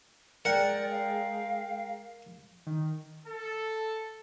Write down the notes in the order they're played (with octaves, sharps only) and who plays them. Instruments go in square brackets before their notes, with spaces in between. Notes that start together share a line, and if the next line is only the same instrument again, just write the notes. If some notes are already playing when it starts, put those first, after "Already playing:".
[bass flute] G#3 [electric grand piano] A#4 G5 [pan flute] D5 [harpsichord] F#5
[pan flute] F5
[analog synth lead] D#3
[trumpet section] A4